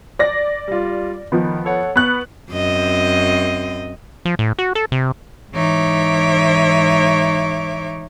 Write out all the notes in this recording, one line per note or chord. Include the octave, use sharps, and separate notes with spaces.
D5 A#6
G3 F4
D#3 F3 B3
A4 C#5 F#5
B3 B4 C#6 F#6
F#2 C4 D#5
F3
A2
F#4
A4
C3
G#2 E3 D#4 C#5 E5 D6